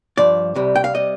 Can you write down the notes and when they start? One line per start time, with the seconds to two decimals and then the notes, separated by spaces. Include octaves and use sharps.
0.17 G2 F3 D5
0.55 C2 C3 G3
0.75 G5
0.84 F5
0.94 C3 G3 D#5